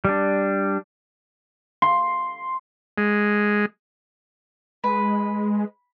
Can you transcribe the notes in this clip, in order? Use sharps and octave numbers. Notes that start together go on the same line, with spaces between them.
G3 D4
C6
G#3
G#3 B4